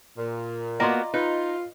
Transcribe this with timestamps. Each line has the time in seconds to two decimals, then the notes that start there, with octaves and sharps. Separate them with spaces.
0.18 A#2
0.80 A#3 B3 F4 F#4 D5 D#5 A#5 C6
1.14 D#4 F4 B4